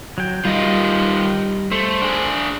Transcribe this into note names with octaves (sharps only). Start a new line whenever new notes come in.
F#3 G5
D#3 G3 F4 D#5
A3 C5
D4 G#4